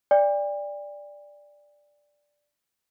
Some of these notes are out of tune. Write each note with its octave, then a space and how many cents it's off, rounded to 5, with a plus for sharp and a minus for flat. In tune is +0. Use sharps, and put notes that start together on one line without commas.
D5 +0 G5 +45